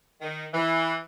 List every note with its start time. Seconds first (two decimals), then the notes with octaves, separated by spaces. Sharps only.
0.21 D#3
0.54 E3